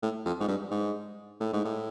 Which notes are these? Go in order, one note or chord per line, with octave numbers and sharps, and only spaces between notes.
A2
F2
G#2
G2
G#2
A2
G#2
A2